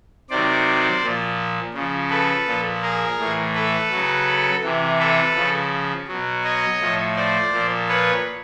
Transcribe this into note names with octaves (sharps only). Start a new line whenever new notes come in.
C3 D#3 F#3 C5 D5
A#2 F3
C#3 F3
A4 B4
A#2 F3
G#4 A#4
A2 E3
A4 B4
C#3 F#3
C3 E3
A4 B4
C#3 F3
B2 F#3
C#5 D#5
A2 F3
C5 D5
A#2 F3
B4 C#5